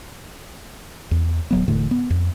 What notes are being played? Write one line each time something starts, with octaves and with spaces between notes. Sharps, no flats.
E2
D1 F#3 B3
E1 A2 D3 A3
B3
F2